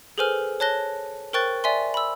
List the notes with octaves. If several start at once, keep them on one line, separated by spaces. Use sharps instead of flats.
G#4 A4 B4 C5 G#5 F6
C#5 A5 F#6 A#6 G7
A#4 C5 G5 C#6 F#6 A6
D5 E5 G#5 C6
B5 E6